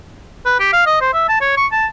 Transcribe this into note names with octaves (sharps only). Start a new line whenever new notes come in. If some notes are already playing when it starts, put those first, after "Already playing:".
B4
G4
F5
D#5
C5
E5
A5
C#5
C#6
A5